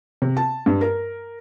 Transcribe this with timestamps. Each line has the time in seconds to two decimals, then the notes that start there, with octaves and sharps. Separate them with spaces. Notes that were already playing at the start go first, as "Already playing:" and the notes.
0.22 C3
0.37 A5
0.66 G2
0.81 A#4